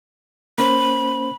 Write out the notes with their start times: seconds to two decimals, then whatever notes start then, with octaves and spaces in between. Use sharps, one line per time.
0.58 A#3 C#4 C5 B5